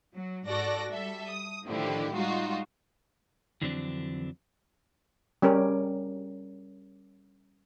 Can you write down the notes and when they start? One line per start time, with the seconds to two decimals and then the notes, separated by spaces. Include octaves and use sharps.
0.15 F#3
0.48 G#2 F#4 A4 D5 A#6
0.92 G3 A4 E5
1.28 D#6
1.68 A2 D3 D#3 F3 E4 G4
2.13 G3 G#3 D#4 F4 F#4
3.61 F2 D3 E3 F#3 C4 D4
5.42 G3 C#4 G4 A#4